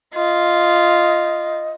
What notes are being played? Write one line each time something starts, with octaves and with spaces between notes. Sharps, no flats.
F4 D#5